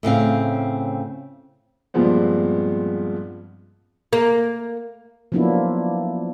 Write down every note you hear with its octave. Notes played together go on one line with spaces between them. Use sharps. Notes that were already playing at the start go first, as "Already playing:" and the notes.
A2 C#3 C4 F5
G2 A#2 F3 G#3 B3 C4
A#3
F3 F#3 A#3 B3 D4 E4